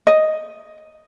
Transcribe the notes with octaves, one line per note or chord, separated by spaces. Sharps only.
D#5